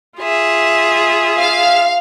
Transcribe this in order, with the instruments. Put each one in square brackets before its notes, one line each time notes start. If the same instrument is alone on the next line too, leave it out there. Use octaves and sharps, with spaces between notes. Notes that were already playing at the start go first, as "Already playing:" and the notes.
[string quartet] F4 G#4 E5
[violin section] F5